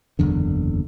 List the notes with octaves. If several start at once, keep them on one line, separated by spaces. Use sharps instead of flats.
F#1 B1 E2 D3